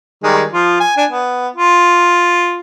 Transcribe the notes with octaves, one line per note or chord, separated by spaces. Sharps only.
D#3 G3 G#3
F3 F4
G#5
D4 G#5
B3
F4